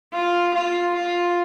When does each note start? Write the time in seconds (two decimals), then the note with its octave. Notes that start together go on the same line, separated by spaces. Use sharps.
0.14 F4
0.55 F4
0.96 F4